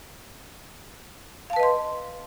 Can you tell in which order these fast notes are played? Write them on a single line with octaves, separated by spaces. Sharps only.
F5 A5 B4 D#5 C6